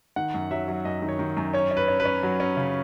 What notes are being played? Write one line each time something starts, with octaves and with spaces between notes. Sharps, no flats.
D#3 F#5
F#2
F#3 E5
F#3
F#2 D#5
D#3
C#5
D#3
F#2
C#4 C#5
C#4
B4
C#4
B4
C#4
F#3
C#4
C#3